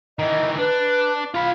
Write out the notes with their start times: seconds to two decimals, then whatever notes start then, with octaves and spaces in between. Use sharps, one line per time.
0.19 D#3 E3 D#5
0.58 D4 B4
1.34 F4 F5 B5